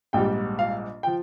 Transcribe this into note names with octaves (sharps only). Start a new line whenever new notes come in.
A#1 G#2 G3 G5
F5
F3 G5